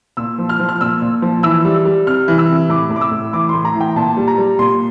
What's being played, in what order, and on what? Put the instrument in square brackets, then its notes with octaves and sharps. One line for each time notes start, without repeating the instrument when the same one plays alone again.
[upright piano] A#2 E6
F3
F6
F3
F6
A#2 E6
A#2
F3
E3 E6
G3
G3
C3 F6
E3
E6
C3
A2 D6
A2
D6
E6
A2
E3 D6
A2 C6
A#5
E3
G5
A#2 A5
G3
A#5
G3
A#2 C6